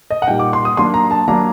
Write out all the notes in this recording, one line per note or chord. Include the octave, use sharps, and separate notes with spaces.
D#5
F#5
A#2 G3 A#3 D#4 G5
D6
C6
D#6
F#3 A#3 D4 C6
A#5
A5
F#3 A#3 D4 A#5